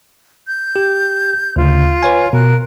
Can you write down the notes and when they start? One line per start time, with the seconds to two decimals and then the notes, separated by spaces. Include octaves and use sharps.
0.48 G6
0.76 G4
1.56 D2 C#3 F4
2.03 B4 C#5 G#5
2.33 B2 A#4 F#6